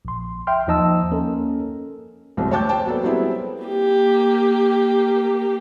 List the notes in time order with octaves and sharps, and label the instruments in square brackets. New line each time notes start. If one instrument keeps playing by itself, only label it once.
[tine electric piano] A#1 C6
E5 G5 C6 F6
D#2 F3 D#4 D#5 A5 E6
A#3 C#4 A4 A#4
[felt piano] C2 F#2 G#3 C4
D2 C#5 G5 A5 D6 G6
C5 G5 A5
F#3 A#3 B3 A4 D5
F#3 G3 B3 C4 E4 G#4
[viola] A#3 G4